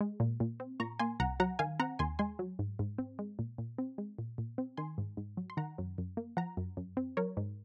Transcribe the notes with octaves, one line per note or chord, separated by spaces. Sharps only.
G#3
A#2
A#2
C4
A#2 A#5 C#6
A#3 G#5 C6
C2 F#5 A#5
F#3 F#5 A#5
D#3 F5 G#5
C4 F#5 A#5
D#2 G#5 C6
G#3 G#5 C6
F#3
G#2
G#2
C4
G#3
A#2
A#2
C4
G#3
A#2
A#2
C4
D#3 G#5 C6
G#2
G#2
F#3
C6
D#3 F#5 A#5
F#2
F#2
A#3
F3 F#5 A#5
F#2
F#2
C4
F#3 A#4 C#5
G#2